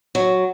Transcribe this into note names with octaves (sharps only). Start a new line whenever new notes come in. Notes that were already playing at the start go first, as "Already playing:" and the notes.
F#3